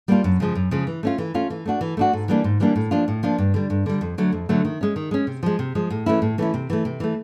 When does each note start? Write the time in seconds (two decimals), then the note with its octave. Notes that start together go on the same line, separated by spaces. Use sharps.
0.08 G3 A#3 D4 F4
0.24 F#2
0.40 C#3 F3 G#3
0.55 F#2
0.71 C#3 F3 G#3
0.87 E3
1.03 A3 C#4 F4
1.18 E3
1.34 A3 C#4 F4
1.50 E3
1.65 A3 D4 F#4
1.81 E3
1.97 A3 D4 F#4
2.13 G#2
2.28 E3 G3 A#3 D4
2.44 G#2
2.60 E3 G3 A#3 D4
2.76 A2
2.91 F3 A#3 D4 F4
3.08 A2
3.23 F3 A#3 D4 F4
3.38 G2
3.54 D3 G3
3.70 G2
3.86 D3 G3
4.01 F2
4.18 D3 F#3 A3
4.32 F2
4.49 D3 F#3 A3
4.65 D#3
4.81 G#3 C#4
4.96 D#3
5.11 G#3 C#4
5.27 C3
5.43 F3 G#3
5.59 C3
5.75 F3 G#3
5.90 A2
6.06 E3 A3 C#4 E4
6.22 A2
6.38 E3 A3 C#4 E4
6.54 C3
6.70 E3 A3
6.85 C3
7.00 E3 A3